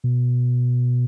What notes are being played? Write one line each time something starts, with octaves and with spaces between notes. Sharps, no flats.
B2